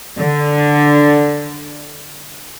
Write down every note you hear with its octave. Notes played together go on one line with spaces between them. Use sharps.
D3